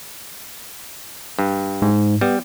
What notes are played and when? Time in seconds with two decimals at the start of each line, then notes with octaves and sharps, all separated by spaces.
1.39 G2
1.82 G#2
2.21 G3 B3